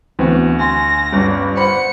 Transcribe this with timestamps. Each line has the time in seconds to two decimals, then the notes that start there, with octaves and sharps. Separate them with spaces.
0.19 D2 E3 B3 C4 F#4
0.60 G#5 C6 A#6
1.13 G1 G2 C#4
1.57 C5 F#5 B5 C#7